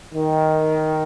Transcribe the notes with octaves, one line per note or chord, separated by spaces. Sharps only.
D#3